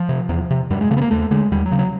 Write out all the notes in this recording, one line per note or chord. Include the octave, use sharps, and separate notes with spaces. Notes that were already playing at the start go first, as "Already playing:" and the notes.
Already playing: F3
C3
E2
C3
F#2 G3
G#3
C#3 A3
B3
A#3
D#2 A3
D3 G#3
D#2 G3
F#3
C#3
F#3